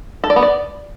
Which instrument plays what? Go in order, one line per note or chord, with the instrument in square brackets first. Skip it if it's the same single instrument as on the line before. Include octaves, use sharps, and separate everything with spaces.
[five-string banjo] A4
D5
B3
D5